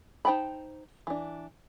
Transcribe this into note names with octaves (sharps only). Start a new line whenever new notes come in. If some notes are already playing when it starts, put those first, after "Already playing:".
D#4 C5 G5 A5 B5
E3 D4